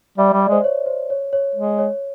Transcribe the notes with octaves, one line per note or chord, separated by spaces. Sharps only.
G3 E5
D5
G3
D5
G#3 C5
C#5
C5
C#5
C#5
G#3
C#5